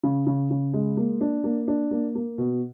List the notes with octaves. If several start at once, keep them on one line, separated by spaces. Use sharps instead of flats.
C#3
C#3
C#3
G#3
A#3
D4
A#3
D4
A#3
A#3
B2